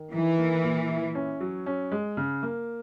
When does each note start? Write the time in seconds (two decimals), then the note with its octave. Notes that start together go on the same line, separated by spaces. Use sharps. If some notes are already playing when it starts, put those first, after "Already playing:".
Already playing: D#3
0.12 E3 D#4
0.38 A#3
0.64 A#2
0.89 E4
1.15 C#4
1.40 F#3
1.66 C#4
1.92 G#3
2.17 C#3
2.43 A#3